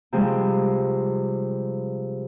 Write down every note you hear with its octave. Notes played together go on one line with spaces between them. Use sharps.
C3 F3 G3 G#3